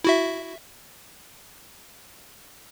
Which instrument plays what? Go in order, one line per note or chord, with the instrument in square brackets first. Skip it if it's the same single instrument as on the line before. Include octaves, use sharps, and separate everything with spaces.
[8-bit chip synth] E4 F#4 E5